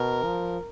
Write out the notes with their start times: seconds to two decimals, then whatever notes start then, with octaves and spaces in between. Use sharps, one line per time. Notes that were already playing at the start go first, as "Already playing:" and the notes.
Already playing: B2 A#4
0.24 F3